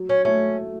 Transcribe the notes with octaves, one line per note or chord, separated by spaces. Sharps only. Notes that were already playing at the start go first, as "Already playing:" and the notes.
Already playing: F#3
C#4
A3 C#4